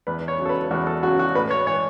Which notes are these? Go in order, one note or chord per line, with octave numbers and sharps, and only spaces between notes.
E2 B4
C#5
C#3 F#3
A4
B4
E2 F#4
A4
C#3 F#3 F#4
F#4
A2 B4
C#5
E3 C#5